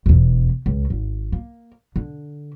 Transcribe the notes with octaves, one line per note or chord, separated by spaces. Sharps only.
E1 E2
C#2
G#1
A#3
D3